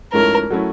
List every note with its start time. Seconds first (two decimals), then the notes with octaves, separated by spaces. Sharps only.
0.13 G#2 F3 A3 C#4 E4 A#4
0.50 F#3 A3 C#4 E4